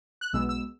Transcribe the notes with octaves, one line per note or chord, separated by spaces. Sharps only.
F#6
B1 B2 G#3 B3 E6
E6